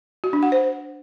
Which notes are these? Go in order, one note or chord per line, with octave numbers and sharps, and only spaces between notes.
F#4
D4
F#5
C5